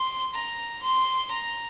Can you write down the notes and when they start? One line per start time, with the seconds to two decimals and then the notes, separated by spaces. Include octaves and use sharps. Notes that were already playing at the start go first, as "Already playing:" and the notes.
Already playing: C6
0.34 A#5
0.83 C6
1.31 A#5